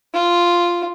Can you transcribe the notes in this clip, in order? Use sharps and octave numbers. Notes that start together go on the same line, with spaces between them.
F4